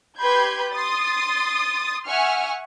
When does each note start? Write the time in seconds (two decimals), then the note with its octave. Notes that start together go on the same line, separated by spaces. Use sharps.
0.19 G4 B4 B5 C6 G6 G#6
0.72 C6 D#6 A6
2.06 E5 F#5 G#5 C#6 F6